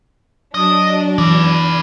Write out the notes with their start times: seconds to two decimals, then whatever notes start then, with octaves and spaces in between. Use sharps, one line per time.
0.54 F#3 D4 D#5
1.18 E3 B4 D5